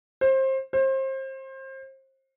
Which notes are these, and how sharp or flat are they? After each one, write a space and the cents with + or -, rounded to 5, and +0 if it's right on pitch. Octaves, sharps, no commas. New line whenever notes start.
C5 +25
C5 +30